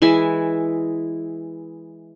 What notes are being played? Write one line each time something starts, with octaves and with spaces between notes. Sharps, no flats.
E3 G#3 E5 G#5